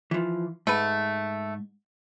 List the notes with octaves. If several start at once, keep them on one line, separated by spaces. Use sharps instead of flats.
E3 F3
G#2 A3 B4